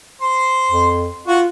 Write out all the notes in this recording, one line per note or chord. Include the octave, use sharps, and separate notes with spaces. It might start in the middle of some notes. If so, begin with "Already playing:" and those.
C5 C6
F2
F4 F#4 C#6